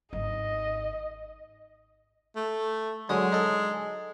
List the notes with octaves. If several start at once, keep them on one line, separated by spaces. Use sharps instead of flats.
G#1 D#4 D#5
A3
D3 F#3 G#3 D#6
D#4 A4